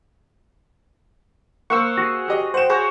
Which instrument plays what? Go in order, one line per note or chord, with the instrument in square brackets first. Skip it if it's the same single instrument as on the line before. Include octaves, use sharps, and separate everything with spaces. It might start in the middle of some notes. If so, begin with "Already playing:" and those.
[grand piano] A#3 [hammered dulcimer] C5 F5 F#5 [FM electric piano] C#6 E6
[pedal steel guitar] F#4 G#4
[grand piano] G4 D#5
[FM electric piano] C5 G5 [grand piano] F#5 E7
[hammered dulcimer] F#4 C5 C#5 [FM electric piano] G#4